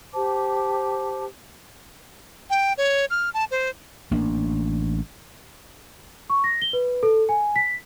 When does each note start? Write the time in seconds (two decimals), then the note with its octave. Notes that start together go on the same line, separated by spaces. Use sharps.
0.14 G4 C5 A5 D6
2.50 G5
2.78 C#5
3.10 F6
3.34 A5
3.51 C5
4.11 A1 A#3 D4
6.30 C#6
6.44 A#6
6.62 G7
6.73 B4
7.03 A4
7.29 G#5
7.56 B6